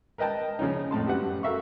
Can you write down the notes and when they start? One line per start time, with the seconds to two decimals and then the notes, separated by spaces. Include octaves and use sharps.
0.18 A#4 B4 D#5 G5 A5
0.59 C#3 F3 C#4 D#4
0.91 F2 A2 A5 C6
1.06 F#2 G3 F#4 G4 B4 F#5
1.43 F#4 A4 A#4 E5 F5 C#6